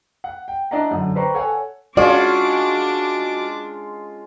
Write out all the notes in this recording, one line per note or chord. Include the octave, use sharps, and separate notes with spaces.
F#5
G5
D4 E4 D5 D#5 F#5 A#5
F#2 D3
B4 C5 D5 G5 A#5 C#6
A4 C#5 F#5 G#5
G#3 C#4 D4 F4 F#4 D5 D6